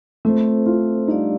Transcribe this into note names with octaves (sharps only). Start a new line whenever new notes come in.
A3 C4 F4 A4 C5
F4
G3 D4 D#4 G4 D5 F5